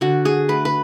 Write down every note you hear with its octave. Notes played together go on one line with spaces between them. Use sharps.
D3 F#4
G#4
A3 B4
B4